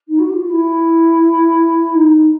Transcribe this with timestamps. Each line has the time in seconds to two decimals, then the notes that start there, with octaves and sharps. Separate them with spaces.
0.08 D#4
0.19 F#4
0.29 G4
0.33 F4
0.50 E4
1.94 D#4